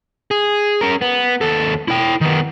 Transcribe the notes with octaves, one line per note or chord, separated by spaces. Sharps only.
G#4
C#4 A#4
B3
D#2 A4
E4 G5
D#3 B3